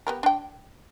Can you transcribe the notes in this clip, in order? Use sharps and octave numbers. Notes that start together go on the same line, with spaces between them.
B3 G4 A#4
D4 G5